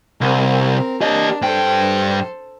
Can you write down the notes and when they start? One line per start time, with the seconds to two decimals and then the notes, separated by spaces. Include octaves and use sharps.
0.21 C2 C4 A#4
1.01 D4 G4 A#4 D#5
1.42 G2 A4 C5 G5